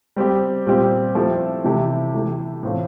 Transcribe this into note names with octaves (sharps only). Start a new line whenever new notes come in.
G3 C4 G4
A#2 G3 C4 G4
F3 A3 C4 E4 G4
C3 E3 A3 E4 G4
E3 A3 E4 G4
A2 E3 A3 C4 F4